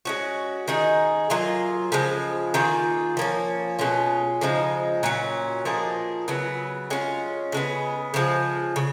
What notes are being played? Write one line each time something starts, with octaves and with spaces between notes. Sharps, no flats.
G#3 C#4 F#4
D#3 G#3 D#4 G#4
F#3 A#3 F4 G#4
C#3 F3 G#3
D#3 A#3 F4 G#4
F3 A#3 C#4
B2 G#3 C#4 F4
C#3 F3 G#3 D#4
A#2 F#3 C#4
F3 A#3 D#4 G#4
C#3 F#3 B3
G#3 C#4 F4
C#3 G#3 B3
C#3 F3 G#3
C#3